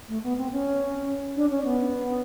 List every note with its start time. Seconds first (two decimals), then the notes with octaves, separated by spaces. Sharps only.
0.08 A3
0.23 B3
0.37 C4
0.51 C#4
1.36 D4
1.50 C#4
1.64 B3